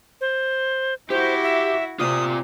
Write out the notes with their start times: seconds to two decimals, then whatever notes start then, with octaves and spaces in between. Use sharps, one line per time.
0.21 C5
1.10 E4 F#4 G4 C5
1.43 E5
1.99 C3 C4 F4 D5 D#6